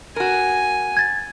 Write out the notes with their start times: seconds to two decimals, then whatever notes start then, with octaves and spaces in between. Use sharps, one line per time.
0.16 F#4 A#4 G#5
0.97 G#6 A6